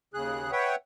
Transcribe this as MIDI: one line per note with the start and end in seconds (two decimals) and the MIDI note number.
0.14 0.51 39
0.14 0.51 49
0.14 0.51 68
0.14 0.51 90
0.52 0.75 71
0.52 0.75 73
0.52 0.75 76
0.52 0.75 78
0.52 0.75 79